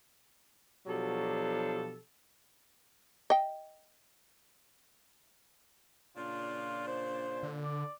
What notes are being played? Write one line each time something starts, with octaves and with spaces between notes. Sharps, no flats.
B2 F3 F#3 D4 G4 A4
D#5 G5
A#2 C#3 D4 F4
C5
D3
D5